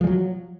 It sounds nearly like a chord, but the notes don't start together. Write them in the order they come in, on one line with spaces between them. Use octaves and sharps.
F3 G#3 F#3